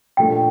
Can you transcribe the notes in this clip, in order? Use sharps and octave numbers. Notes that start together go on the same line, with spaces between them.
A#2 F3 A3 D4 G5